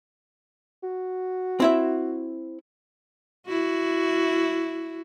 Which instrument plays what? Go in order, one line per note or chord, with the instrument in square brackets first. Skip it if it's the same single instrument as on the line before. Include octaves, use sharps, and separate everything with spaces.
[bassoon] F#4
[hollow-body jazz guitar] C4 E4 E5
[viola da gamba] E4 F#4